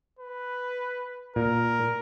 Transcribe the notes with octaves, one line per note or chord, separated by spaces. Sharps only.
B4
A#2 A#4